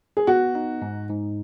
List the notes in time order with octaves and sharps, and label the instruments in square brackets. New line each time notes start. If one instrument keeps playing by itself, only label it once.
[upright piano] G#4
[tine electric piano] B3 [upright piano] F#4
[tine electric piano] D#4
G#2
G#2